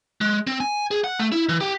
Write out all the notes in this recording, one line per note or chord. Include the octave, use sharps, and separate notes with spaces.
G#3
C4
G#5
G#4
F#5
A3
E4
E3
G4